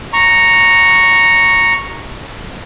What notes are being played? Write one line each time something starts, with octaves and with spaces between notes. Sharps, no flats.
A#5 C#6